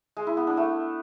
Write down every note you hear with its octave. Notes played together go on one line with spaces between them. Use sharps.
G#3
E4
B3
D4
A3